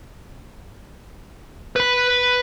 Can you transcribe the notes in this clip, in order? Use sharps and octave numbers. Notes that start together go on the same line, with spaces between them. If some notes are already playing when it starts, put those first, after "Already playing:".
B4 B5